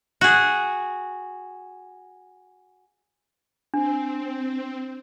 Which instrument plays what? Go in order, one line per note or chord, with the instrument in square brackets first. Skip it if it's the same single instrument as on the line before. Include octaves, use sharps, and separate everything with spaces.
[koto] F#4 G#4
[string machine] C4 [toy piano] D4